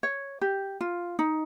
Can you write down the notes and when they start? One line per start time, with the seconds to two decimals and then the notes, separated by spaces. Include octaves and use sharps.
0.03 C#5
0.41 G4
0.81 F4
1.19 D#4